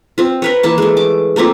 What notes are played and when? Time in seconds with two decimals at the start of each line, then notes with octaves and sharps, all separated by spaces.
0.18 C4 F4
0.42 A#4 B4 C#5
0.63 E3 A#3 A5
0.78 G#3 A3
0.97 D6
1.36 A3 A#3 C4 F4